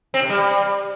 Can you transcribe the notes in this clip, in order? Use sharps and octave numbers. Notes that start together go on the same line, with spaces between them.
C4
C3
G3